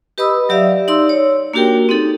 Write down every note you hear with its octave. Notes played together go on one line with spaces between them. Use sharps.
G4 B4 D#5 B5 D#6 E6
F#3 G4 D5 E5 F5
D#4 D5 C6 E6
C#5
A#3 D4 F#4 G4 A#4 G5
C4 D#4 A4